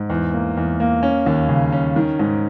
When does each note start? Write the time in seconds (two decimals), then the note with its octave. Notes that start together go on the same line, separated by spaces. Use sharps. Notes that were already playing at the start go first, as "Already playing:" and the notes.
Already playing: G#2
0.10 E2
0.33 A#3
0.57 E2
0.80 A#3
1.03 C#4
1.26 D#2
1.49 C#3
1.72 C#4
1.96 D#3
2.19 G#2